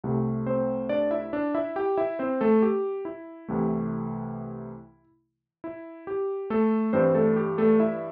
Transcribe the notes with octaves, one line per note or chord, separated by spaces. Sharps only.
C2 C3 A3
C4 C5
D4 D5
E4 E5
D4 D5
E4 E5
G4 G5
E4 E5
C4 C5
A3 A4
G4
E4
C2 C3 E3 A3
E4
G4
A3 A4
G2 E3 G3 C4 C5
A3 A4
G4
A3 A4
E4 E5